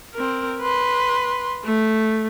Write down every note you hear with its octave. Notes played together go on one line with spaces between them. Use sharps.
C4 A#4
B4 C6
A3